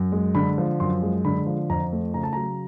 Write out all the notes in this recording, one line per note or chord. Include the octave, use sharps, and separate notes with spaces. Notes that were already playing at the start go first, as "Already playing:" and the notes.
Already playing: F#2
G#3
D3 B5
F3
F#2 C6
G#3
D3 B5
F3
F2 A#5
A3
C#3 A#5
A5
F#3 A#5